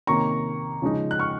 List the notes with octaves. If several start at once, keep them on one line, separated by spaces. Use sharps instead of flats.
C3 D#3 A#3 C#4 A#5 C#6
C#3 F3 G#3 D#4
F#6
C#6 F6